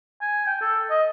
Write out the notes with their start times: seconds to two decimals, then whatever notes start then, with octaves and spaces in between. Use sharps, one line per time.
0.22 G#5
0.47 G5
0.61 A4
0.90 D#5